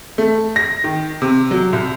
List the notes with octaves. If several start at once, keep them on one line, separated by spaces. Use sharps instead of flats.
A3
A#6
D#3
C3
F#3
C2